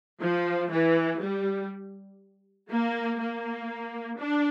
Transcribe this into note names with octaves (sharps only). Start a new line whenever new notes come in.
F3
E3
G3
A#3
A#3
D4